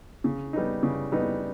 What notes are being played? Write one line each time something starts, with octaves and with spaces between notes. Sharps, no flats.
C#3
G3 B3 D#4
C#3
G3 B3 D#4